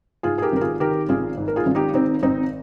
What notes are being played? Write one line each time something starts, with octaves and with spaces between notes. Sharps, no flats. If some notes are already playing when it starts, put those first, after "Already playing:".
G#2 F4 G#4
G#4
G4 A#4
G#1 A#4
F4 G#4
D#3 G4 A#4
G#1 F4 G#4
G#2
A#4
F4 G#4
G#1
D#4 G4
D#3 C4 D#4
G#1 C4 D#4